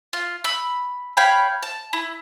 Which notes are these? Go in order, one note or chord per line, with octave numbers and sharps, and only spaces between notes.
F4
B5 E6
C#5 F5 G5 B5
A5
E4